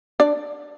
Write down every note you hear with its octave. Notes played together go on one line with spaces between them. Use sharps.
D4 D5